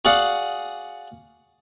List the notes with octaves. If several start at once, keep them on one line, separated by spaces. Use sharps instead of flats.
F#4 G#4 D5 F5 F#5